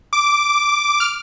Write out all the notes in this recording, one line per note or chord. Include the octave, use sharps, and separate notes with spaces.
D6
F6